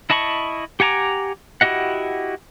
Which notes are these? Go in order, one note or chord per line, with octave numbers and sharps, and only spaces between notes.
E4 D#5 A5 B5 C#6
G4 F#5 G#5 A#5 D6
E4 F#4 G4 D#5 F#5